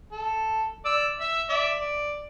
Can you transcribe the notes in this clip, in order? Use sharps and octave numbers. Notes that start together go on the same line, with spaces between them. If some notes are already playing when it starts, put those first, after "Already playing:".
A4
D5 E6
E5 E6
D5 E5
D5